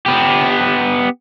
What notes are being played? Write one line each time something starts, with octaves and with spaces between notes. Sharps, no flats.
B3 G4